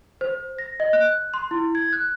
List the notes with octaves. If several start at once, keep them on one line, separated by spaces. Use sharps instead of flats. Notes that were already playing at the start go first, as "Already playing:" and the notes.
C5
A#6
D#5
F#6
C6
E4
G#6
F#6